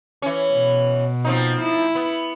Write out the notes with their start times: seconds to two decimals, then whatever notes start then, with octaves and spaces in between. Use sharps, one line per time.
0.22 E3 C#4
0.54 B2
1.25 F3 C4 D#4
1.61 E4
1.95 B3